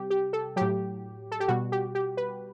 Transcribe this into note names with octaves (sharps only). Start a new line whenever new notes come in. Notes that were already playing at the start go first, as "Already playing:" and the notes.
Already playing: C3 G3 G4
G4
A4
A2 F#3 G4
A4
G4
B2 G3 F#4
G4
G4
B4